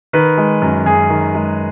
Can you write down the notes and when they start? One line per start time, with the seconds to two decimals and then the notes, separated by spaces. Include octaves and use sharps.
0.13 D#3 B4
0.37 G#3
0.62 F#2
0.86 F#2 G#4
1.10 D#3
1.35 G#3